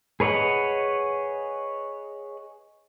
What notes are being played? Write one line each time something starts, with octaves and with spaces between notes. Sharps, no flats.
G#4 B4 C#5 D#5 F#5